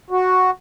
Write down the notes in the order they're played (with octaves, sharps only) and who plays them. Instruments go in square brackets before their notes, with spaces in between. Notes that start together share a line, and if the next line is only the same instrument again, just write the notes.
[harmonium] F#4